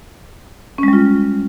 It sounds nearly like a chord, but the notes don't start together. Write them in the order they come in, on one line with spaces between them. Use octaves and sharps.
C#4 G#3 G3 F4